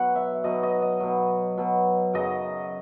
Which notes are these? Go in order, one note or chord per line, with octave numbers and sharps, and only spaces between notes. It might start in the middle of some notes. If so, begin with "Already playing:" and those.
Already playing: B2 F#3 F#5
E5
B2 F#3 D#5
D#5
D#5
B2 F#3
B2 F#3
F#2 C#3 F#3 D#5